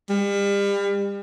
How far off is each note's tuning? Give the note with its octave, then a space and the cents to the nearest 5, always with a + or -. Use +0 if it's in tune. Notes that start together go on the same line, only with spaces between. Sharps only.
G3 +35